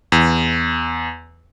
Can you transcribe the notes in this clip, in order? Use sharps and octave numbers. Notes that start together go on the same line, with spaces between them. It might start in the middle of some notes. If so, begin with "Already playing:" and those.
E2